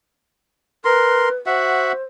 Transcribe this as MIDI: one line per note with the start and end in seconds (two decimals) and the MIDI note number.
0.85 1.29 70
0.85 1.35 71
0.85 1.29 84
1.46 1.92 66
1.46 2.03 72
1.46 1.92 76
1.46 1.92 78